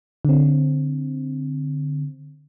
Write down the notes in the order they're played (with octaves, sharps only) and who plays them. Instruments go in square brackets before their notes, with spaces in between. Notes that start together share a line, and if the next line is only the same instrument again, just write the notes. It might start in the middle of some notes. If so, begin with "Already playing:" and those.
[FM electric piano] D3 C4